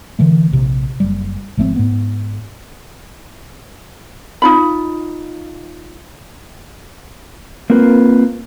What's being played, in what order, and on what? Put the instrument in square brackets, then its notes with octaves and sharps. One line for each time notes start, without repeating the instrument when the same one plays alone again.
[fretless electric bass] D3 E3 A3
A#1 C3
F#1 G3
G#1 F3 A3 C4
G#2 B3
[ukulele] D#4 F4 B5
[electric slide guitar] A#3 C4 F4 A#4 B4